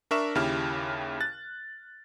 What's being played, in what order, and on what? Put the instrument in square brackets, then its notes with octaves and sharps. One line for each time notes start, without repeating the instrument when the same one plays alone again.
[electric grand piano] D4 A#4 E5 C#6 E7
D#2 C#3 E4 G4 F6
F#6 A6